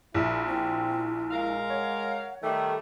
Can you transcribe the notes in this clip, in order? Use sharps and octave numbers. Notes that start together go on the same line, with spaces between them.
A#1 E4
C4 E4
G#3 A#4 F5
C#5 F#5
D#3 G3 A3 A4